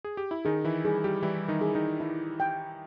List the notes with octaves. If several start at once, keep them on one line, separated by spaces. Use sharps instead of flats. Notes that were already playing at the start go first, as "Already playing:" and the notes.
G#4
G4
E4
D#3 D#4 G#4
E3 E4
G3 G4 G#4
G3 G4
E3 G3 E4
D#3 D#4
G#4
D#3 D#4
E4
G5